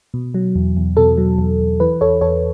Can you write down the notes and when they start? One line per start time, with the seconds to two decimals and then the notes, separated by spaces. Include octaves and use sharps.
0.14 B2
0.34 F#3
0.55 E2
0.77 E2
0.97 B2 A4
1.17 F#3
1.38 E2
1.59 E2
1.80 E3 B4
2.01 E2 A4 C#5
2.21 E2 A4 C#5